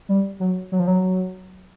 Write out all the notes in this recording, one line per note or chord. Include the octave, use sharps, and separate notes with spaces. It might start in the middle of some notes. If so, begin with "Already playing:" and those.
G3
F#3
F#3
F3
F#3